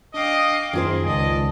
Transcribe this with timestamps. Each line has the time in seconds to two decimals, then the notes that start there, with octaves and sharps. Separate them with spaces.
0.14 D4 D#5 F5 G5 D6
0.73 F#2 D#3 F4 G#4 C5
1.05 C#2 D5 D#5 A5